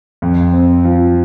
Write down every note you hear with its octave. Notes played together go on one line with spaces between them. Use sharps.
F2
C4
F3